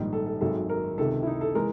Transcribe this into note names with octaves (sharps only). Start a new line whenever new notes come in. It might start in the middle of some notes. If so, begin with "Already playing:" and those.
Already playing: A#1 G#2 D#3 G3
A4
A4
G#1 F#2 D#3 G#3 A4
A#4
C#2 C3 D#3 A4
E4
D#4
A4
E3 G#3 A#4